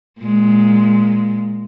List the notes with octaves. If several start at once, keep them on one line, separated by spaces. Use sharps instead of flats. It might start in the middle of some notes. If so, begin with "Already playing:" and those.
A#2 G#3